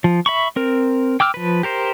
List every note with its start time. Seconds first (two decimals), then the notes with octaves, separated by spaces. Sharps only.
0.04 F3
0.26 E5 B5 C#6
0.56 C4 A#4
1.20 G5 D6 E6 F6
1.34 F3 B4
1.63 G4 A#4 C5